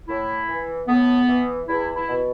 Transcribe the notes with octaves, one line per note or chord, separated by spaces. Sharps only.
A2 E4
E3
A2 B3
E3
E2 E4
E4
B2